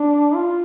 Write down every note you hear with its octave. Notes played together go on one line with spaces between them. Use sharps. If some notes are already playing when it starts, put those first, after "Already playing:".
Already playing: D4
F4